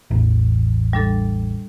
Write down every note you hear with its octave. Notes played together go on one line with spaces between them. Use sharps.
A1 E2
G3 D4 A4